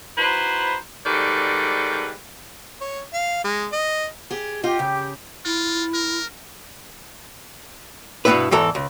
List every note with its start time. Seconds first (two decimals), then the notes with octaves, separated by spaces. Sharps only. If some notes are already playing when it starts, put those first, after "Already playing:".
0.18 D#4 E4 F#4 B4 C5
1.06 G#2 D#3 G3 A4 B4 D5
2.81 C#5
3.13 F5
3.44 G#3
3.72 D#5
4.30 G4 G#4
4.63 F4 G4 D#5 G6
4.79 C#3
5.45 E4 F4
5.93 A#4
8.25 G2 B2 E3 B3 E4 B4
8.51 E2 G#2 E3 A4 A#5
8.75 C#2